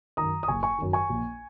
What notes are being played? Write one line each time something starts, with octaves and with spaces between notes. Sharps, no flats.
F#2 D#3 A#5 D#6
D#6
F#1 G#5 C#6
G#5 C#6
F#2 D#3
G#5 C#6
A#1